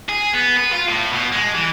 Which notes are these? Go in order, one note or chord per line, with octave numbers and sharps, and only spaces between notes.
G#4
B3
B4
F4
A2
B2
G#3
E3